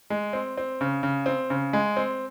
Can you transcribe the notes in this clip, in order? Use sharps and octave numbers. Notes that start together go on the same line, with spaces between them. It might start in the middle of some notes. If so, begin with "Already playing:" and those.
G#3
C4
C4
C#3
C#3
C4
C#3
G#3
C4